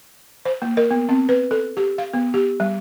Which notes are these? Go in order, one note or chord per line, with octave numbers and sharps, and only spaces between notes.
C5
A#3
A#4
B3
C4
B4
A4
G4
F5
B3
G4
G3